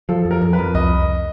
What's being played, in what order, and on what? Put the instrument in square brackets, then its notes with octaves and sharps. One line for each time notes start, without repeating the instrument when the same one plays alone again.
[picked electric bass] F3 [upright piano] A4
[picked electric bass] F2
[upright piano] A#4
[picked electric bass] F2
[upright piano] B4
[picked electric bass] F2
[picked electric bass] C2 [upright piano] D#5